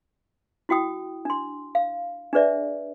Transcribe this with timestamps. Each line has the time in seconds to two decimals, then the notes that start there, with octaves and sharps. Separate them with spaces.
0.69 E4 F#4 G5 D#6
1.25 D4 C6
1.75 F5
2.33 D4 G#4 B4 D5 E5